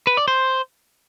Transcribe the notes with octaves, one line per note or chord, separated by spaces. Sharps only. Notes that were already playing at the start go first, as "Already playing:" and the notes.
B4
D5
C5